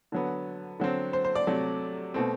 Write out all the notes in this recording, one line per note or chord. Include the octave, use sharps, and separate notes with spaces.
D3 F#3 B3
D3 F#3 C4
C5
C5
D5
C3 F#3 A3
B2 A3 C4